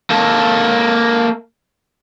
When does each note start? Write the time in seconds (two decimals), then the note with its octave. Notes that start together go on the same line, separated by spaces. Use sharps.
0.10 A#3 A4